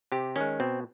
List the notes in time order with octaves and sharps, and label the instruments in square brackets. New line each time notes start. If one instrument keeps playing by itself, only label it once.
[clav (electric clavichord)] C3 G4
D#3 G#3 C#4
B2 C4